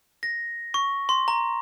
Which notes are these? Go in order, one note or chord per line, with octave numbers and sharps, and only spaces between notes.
A#6
C#6
C6
A#5